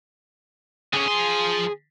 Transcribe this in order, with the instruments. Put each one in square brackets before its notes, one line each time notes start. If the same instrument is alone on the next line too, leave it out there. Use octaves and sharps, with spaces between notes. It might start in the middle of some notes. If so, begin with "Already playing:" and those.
[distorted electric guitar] D3 C#4 [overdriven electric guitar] G#4
[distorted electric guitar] F3 C6